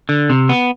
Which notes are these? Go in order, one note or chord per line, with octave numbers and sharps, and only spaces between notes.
D3
C3
B3